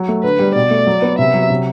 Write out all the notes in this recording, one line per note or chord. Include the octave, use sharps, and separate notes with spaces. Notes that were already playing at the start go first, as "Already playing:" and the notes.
Already playing: F#3
A3
D3 B4
G3
B2 D5
A3
F#3
B3
C3 E5
F#3
C3